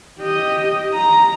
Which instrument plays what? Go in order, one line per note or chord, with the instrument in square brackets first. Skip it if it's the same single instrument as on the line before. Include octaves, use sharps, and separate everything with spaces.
[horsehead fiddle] G4 D#5
A#5